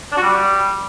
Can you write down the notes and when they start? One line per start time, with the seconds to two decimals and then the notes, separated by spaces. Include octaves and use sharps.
0.12 D4
0.17 F#4
0.23 G3